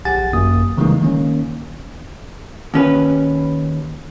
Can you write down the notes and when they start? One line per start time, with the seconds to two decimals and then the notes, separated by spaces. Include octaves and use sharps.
0.05 A#1 G4 F#5 G#5 A6
0.33 G#1 F#2 A#3 D#6
0.77 C#3 E3 G3 G#3 A#3 D#4
1.01 D#3 A#3 C#4
2.74 D#2 C#4 B4